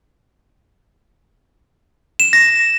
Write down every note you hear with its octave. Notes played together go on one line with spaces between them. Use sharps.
E7
A#6